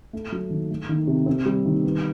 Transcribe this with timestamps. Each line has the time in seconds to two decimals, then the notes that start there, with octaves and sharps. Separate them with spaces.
0.13 A3
0.32 F#3
0.50 D#3
0.70 A3
0.89 D#3
1.07 C3
1.26 C4
1.45 G3
1.65 D#3
1.84 B3